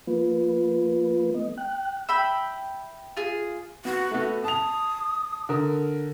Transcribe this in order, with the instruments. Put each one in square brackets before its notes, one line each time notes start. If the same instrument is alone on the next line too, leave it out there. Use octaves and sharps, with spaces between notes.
[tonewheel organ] F3 A#3 F4 B4
A3 B3 D#5
G5 F#6
[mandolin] E5 G5 B5 E6
F4 G#4
[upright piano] B3 [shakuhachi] F#4
[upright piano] A3 B3
[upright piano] A5 F7 [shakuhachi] D#6
[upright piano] D3 A#4